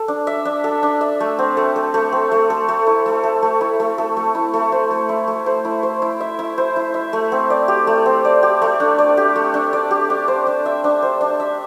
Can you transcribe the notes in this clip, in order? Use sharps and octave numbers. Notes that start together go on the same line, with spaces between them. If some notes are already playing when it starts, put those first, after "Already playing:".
Already playing: A4
D4
E5
D4
A4
D4
E5
A3
C4
A3
A4
A3
C4
A3
A4
A3
E4
A3
A4
A3
E4
A3
A4
A3
E4
A3
C5
A3
E4
A3
C5
E4
C5
E4
E5
E4
C5
E4
E5
A3
C4
D5
G4
A3
C4
D5
G4
A3
D4
D5
G4
A3
D4
D5
G4
D4
C5
D4
E5
D4
C5
D4
E5